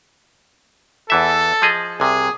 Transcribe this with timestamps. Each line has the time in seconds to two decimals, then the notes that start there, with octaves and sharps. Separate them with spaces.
1.10 E2 E3 A4 E5
1.62 F3 G#4 D#5
2.00 C2 C3 G#4